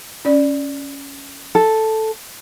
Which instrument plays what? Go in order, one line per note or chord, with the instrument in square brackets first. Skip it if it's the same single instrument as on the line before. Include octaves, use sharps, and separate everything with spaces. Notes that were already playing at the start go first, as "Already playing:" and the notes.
[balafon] C#4 D5
[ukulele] A4